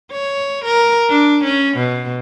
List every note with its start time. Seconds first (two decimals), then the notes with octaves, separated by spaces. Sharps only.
0.12 C#5
0.65 A#4
1.10 D4
1.44 C#4
1.77 B2